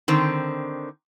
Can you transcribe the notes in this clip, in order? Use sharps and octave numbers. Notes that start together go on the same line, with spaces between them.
D3 D#3 C4